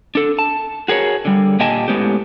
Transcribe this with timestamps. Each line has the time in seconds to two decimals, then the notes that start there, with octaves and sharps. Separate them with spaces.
0.15 D4 A4
0.39 A5
0.88 F#4 G#4 A#4 C#5
1.25 D3 G3
1.60 A#2 G4 D#5 G#5 A5
1.88 A2 G#3 B3 C#4 G4